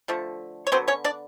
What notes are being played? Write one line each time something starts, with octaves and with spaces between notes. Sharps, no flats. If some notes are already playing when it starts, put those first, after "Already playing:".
D3 F3 A3
C#5
D3 F#3 B3 C4 C5
C#4 C#5
D4 D5